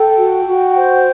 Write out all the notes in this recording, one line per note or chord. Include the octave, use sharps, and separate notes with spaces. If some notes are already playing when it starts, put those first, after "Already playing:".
Already playing: A4 G5
F#4
F#4
C5